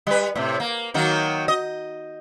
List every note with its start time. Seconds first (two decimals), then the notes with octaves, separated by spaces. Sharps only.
0.07 G3 B4
0.35 A2 C3
0.60 A#3
0.94 D#3 F#3 A#3
1.48 D#5